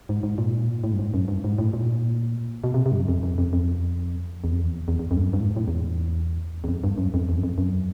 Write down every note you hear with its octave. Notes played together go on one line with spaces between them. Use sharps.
G#2
G#2
A#2
A2
G2
G#2
F#2
G2
G#2
A2
A#2
B2
C3
C3
G2
F#2
F2
F2
F2
F2
E2
F2
E2
E2
E2
F2
G2
F#2
G2
A2
G#2
A2
E2
E2
F2
G2
F#2
F2
E2
F#2
F2
F#2